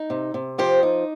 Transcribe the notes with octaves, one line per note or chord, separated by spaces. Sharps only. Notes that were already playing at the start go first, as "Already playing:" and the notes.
Already playing: D#4
C3
C3
F3 G4 C5
D#4